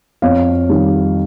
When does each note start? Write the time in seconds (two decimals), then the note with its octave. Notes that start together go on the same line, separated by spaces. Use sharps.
0.22 F2 C#5 F5
0.69 D#3 G3